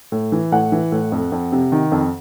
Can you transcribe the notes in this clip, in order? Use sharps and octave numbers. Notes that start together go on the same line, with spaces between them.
A2
E3
A2 F#5
E3
A2
F2
F2
C3
D#3
F2